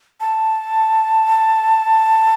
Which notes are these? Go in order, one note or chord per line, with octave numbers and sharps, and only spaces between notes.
A5